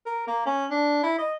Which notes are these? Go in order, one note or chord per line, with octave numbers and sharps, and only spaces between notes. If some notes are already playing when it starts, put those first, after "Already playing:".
A#4
A#3
C#4
D4
E4
D#5